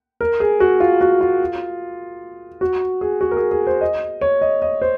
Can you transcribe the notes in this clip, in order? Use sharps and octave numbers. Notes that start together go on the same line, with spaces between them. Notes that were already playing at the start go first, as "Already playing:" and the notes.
A#4
G#4
F#4
F4
F#4
F4
F#4
G#4
F#4
A#4
G#4
G#4
C5
D#5
C#5
D#5
D#5
C5